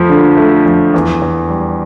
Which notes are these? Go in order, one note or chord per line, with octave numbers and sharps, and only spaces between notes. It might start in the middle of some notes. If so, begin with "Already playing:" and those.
Already playing: F2 F3 A3
D3
A3
F2
E2
E2
G3